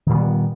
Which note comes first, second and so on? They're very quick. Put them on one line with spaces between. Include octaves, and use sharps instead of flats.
D#3 A#2 G3 B3